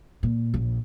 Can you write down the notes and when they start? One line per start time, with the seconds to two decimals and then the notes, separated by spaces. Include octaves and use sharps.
0.23 A#2
0.54 A#1